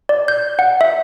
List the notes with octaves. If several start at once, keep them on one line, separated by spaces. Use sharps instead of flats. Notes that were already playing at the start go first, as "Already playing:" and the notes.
D5
G6
F#5
E5